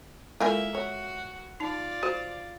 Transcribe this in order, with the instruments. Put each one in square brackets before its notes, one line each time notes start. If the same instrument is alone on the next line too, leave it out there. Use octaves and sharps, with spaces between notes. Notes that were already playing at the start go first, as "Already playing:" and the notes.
[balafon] G#3 F4 A4 [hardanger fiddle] A#3 E5 [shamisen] E4 A#4 G#5
[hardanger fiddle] F#4 [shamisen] C#5
[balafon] D#4 A5 [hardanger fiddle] F4 D5
[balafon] F#4 [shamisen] C5